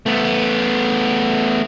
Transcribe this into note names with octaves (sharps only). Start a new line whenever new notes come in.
A3 B3